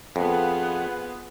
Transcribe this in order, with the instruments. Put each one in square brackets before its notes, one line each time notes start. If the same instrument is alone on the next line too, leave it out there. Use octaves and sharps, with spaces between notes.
[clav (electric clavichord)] F2 [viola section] B3 F4 G#4 [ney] F#5